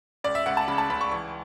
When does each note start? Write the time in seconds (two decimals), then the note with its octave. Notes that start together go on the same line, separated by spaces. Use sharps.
0.24 C#2 D5
0.35 E5
0.46 C#2 F#5
0.57 A5
0.68 C#3 B5
0.78 A5
0.90 C#2 B5
1.01 C#6
1.11 E3 C#6